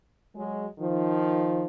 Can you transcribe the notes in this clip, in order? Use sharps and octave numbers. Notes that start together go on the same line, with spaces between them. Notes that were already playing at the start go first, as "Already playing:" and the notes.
F#3 G#3
D#3 F3